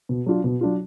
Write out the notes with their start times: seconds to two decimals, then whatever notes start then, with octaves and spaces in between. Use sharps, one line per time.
0.09 B2
0.26 F#3 D4 F4
0.44 B2
0.61 F#3 D4 F4